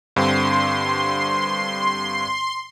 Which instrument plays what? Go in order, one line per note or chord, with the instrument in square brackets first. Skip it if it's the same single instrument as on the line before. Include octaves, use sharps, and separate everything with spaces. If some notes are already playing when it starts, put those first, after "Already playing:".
[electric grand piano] G2 D3 C4 [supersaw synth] C6